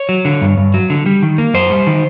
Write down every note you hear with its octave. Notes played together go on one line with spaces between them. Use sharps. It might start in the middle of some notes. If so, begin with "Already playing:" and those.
Already playing: C#5
F#3
D3
G2
G2
F#3
D3
G3
D#3
A#3
F#2 C5
G3
D#3